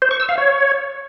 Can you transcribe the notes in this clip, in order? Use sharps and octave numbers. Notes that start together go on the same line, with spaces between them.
C5
C#6
E6
F5
C#5